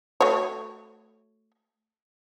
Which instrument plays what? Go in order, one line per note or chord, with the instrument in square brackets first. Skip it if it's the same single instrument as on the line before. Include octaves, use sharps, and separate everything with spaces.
[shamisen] A3 F#4 C#5